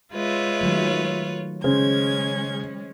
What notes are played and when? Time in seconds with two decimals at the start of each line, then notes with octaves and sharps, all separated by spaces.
0.14 G#3 F4 B4 C#5 E5
0.61 D#3 F#3 A3
1.64 C#3 G#3 C#4 C5 G#6